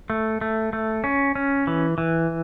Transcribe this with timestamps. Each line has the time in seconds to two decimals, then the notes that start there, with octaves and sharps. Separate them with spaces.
0.10 A3
0.41 A3
0.73 A3
1.04 C#4
1.35 C#4
1.67 E3
1.98 E3